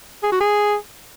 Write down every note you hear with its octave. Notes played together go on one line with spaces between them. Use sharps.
G#4
F#4
G#4